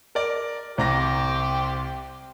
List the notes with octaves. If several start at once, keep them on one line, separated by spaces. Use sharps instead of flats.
A#4 D5
C2 G4 C5 G5 A#5 A#6